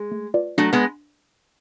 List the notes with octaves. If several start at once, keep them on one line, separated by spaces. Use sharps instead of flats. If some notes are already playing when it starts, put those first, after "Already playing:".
Already playing: G#3
A3
F4 B4 D5
F#3 A3 D4
G#3 B3